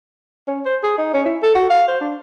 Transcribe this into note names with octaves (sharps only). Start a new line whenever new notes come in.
C#4
C5
G#4
D#4
C#4
E4
A4
F#4
F5
C5
D4